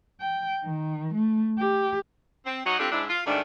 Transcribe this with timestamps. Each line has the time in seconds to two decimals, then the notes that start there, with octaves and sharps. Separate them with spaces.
0.21 G5
0.65 D#3
1.14 A3
1.59 G4
2.46 C4
2.65 F#3 D#4 C#5 D#5 F#5
2.79 G3 C4 D4 F4 G4 A4
2.91 G#2 D4 E4
3.08 F4
3.26 G#2 D#3 G3 A3 D4